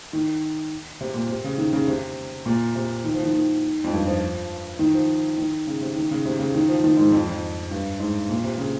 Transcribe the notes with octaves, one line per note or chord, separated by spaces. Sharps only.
D#3
C3
A#2
C3
C#3
D#3
C#3
C3
A#2
C3
D#3
F3
D#3
D#3
F2
G2
F3
D#3
F3
D#3
C#3
C3
D#3
C#3
C3
C#3
D#3
F3
D#3
G#2
F2
F2
G2
G#2
A#2
C3
C#3